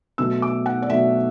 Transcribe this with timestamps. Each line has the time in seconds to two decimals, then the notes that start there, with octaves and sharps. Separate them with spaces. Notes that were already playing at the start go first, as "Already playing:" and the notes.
0.18 B2 F#3 A3 E6
0.42 D6
0.66 F#5
0.82 D5
0.89 B2 F#3 A3 E5